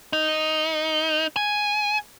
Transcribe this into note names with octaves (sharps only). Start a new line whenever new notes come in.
D#4
G#5